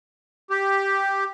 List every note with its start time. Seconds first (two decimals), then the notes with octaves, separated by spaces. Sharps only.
0.50 G4